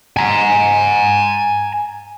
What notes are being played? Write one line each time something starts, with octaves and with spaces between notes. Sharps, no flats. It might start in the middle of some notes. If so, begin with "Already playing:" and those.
G#5 A#5